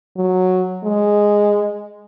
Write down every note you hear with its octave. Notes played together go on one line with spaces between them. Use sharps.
F#3
G#3